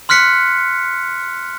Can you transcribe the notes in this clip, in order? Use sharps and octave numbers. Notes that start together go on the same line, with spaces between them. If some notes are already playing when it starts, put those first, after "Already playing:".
C6 F6 F#6 B6 C#7